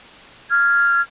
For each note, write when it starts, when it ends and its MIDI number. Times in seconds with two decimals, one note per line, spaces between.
0.50 1.01 89
0.50 1.01 92